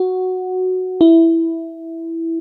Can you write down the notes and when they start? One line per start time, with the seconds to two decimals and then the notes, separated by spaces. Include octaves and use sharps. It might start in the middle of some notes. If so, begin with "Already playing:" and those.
Already playing: F#4
1.01 E4